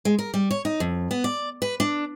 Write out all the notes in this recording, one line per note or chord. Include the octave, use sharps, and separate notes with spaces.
G#3
A#4
G3
C#5
D#4
F2
B3
D5
B4
D4